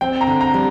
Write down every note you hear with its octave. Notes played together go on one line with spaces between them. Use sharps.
C4 G5
A#5
D3
A#5
G3